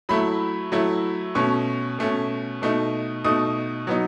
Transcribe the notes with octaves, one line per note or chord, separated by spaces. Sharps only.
F#3 A3 E4 B5
F#3 A3 E4
B2 A3 C#4 C#6
B2 A3 C#4
B2 A3 D#4
B2 A3 D#4 D#6
F#3 B3 D#4